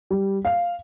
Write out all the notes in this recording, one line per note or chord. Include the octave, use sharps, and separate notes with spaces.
G3
F5